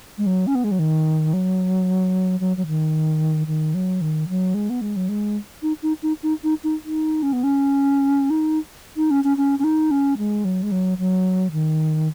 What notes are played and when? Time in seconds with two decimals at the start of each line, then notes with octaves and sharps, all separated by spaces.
0.18 G#3
0.26 F#3
0.47 C#4
0.55 B3
0.64 G#3
0.71 F#3
0.79 D#3
1.33 F#3
2.40 F#3
2.57 F#3
2.67 D#3
3.47 D#3
3.74 F#3
4.01 D#3
4.29 F#3
4.54 G#3
4.70 B3
4.81 G#3
4.96 F#3
5.09 G#3
5.63 D#4
5.83 D#4
6.03 D#4
6.23 D#4
6.44 D#4
6.64 D#4
6.85 D#4
7.23 C#4
7.33 B3
7.43 C#4
8.30 D#4
8.97 D#4
9.11 C#4
9.24 C#4
9.37 C#4
9.59 C#4
9.64 D#4
9.91 C#4
10.18 G#3
10.45 F#3
10.63 G#3
10.71 F#3
10.98 F#3
11.52 D#3